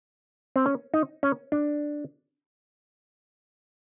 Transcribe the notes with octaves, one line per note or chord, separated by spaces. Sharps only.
C4
C#4
D#4
C#4
D4